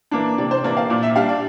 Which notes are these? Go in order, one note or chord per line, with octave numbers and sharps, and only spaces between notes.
E3 A#3 D4
C3 D5
C5
E3 A#3 D4 D5
F5
A#2 D5
E5
G3 D4 F5
D5